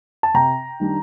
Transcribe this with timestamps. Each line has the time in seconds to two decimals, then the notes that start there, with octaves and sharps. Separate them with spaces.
0.23 A5
0.34 C3 G5 A#5
0.80 D#3 G3 D4